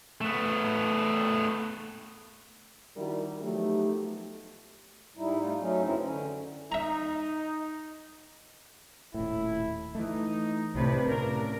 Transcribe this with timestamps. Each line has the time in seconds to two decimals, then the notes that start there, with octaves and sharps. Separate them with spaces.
0.21 A3 B3
2.96 D#3 G3 D4 E4 F#4 A#4
3.42 F3 F#3 A3 B3 D#4 G4
5.17 G#2 G3 D#4 E4
5.40 A3 D#4 F4
5.59 F#3 A3 C#4 D#4
5.83 F#2 C#3 E3 C4 C#4 E4
6.02 D3 C#4
6.72 D#4 E5 A#5
9.14 D#1 A2 E4
9.95 E3 A3 D#4
10.74 C2 A2 C3 D4 B4
11.07 A2 C#3 A#4